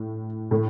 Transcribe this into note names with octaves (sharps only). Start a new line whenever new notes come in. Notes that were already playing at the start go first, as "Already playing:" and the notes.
Already playing: A2
A2 A3